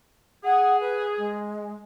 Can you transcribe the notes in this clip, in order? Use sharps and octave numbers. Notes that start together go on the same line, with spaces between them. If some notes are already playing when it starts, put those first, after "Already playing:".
G#4 F#5
B4
G#3